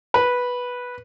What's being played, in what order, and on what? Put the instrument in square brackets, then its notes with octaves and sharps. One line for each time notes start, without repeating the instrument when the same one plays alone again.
[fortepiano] B4